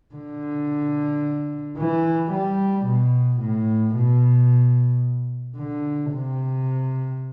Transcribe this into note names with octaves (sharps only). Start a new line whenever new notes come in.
D3
E3
G3
B2
A2
B2
D3
C3